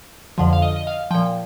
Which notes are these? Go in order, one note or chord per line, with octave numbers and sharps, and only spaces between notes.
F2 D3 F3
F5
D#5
D#5
F5
A#2 F3 G5